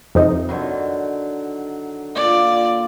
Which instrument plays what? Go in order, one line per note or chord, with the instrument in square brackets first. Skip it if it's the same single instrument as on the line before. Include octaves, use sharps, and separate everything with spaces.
[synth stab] F2 C3 D#4
[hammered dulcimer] D3 D#3 F#3
[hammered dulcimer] A#2 [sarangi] D5